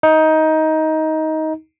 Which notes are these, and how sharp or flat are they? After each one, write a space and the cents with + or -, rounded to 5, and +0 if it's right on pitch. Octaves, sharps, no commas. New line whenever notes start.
D#4 +15